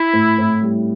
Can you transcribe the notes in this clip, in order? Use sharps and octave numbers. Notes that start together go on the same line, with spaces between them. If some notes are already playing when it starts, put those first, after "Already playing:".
Already playing: E4
A2
A2
G3